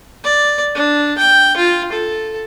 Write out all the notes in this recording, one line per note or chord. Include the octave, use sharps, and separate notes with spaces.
D5
D4
G5
F4
A4